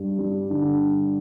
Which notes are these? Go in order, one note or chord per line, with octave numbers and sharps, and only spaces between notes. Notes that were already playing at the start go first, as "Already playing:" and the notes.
Already playing: G2 D4
G3
D3